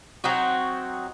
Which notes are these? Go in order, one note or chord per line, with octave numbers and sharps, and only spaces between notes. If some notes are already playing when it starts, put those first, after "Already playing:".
F#3 C4 D#4 F#4